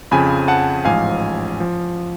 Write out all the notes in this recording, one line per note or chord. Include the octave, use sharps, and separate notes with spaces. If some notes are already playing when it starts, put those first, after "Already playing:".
F2 C#3 F3 G#5 B5
F#5 A5
A1 G#2 F3 F5 G#5
F3